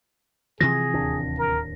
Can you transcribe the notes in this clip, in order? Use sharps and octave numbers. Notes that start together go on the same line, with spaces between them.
C3 E3 F3 G#4 A#6
D1 D#2 D4
A#4